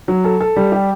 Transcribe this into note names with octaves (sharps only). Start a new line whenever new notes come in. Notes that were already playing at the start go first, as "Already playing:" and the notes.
F#3
A4
A4
G3
G4